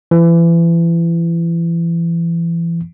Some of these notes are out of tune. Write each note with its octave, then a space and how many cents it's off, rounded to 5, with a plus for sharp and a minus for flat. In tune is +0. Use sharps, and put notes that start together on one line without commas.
E3 +30